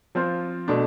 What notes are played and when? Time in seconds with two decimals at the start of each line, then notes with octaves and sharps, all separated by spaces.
0.15 F3 C4 F4 C5
0.68 B2 A3 D4